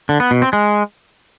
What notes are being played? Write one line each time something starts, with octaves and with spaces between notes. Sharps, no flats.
D3
B3
B2
C4
G#3